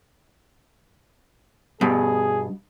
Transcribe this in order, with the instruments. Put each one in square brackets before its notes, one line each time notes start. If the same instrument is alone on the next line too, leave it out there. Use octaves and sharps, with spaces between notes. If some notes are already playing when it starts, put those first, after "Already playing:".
[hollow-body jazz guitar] G2 B2 [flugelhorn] G#4